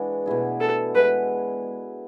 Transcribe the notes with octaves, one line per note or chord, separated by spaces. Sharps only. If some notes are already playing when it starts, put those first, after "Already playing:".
Already playing: E3 G#3 D4 E4 F#4
B2 A3 E4 G#4
A4
G#3 B3 E4 B4